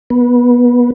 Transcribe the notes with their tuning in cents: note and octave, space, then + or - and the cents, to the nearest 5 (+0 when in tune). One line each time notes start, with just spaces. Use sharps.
B3 -20